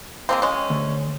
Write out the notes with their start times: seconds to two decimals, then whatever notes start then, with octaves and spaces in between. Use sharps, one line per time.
0.29 G#3 A#3 C4
0.42 G#3 C#4
0.70 D2